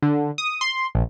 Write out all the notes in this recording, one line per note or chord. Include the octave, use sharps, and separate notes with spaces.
D3
D#6
C6
A#1